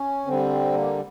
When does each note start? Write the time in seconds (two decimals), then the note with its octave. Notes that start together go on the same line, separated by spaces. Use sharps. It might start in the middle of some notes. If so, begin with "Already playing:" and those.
Already playing: C#4
0.26 D3 G3 C4
0.73 A#3